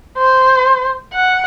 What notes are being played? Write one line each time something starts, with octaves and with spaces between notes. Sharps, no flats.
C5
F#5